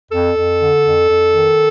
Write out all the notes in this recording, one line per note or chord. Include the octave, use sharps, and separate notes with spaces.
F2 A4
F2
D3
F2
F2
D#3